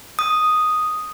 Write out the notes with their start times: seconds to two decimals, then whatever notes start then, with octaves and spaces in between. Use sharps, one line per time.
0.19 D#6